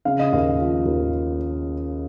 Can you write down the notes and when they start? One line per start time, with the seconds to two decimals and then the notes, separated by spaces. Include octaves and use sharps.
0.05 C#3 F5
0.19 D#5
0.33 D#2 F5
0.59 F3
0.86 D#2